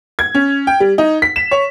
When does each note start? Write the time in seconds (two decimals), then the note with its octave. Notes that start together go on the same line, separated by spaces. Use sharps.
0.19 G#6
0.35 C#4
0.67 G5
0.80 G3
0.98 D#4
1.22 B6
1.36 E7
1.51 C#5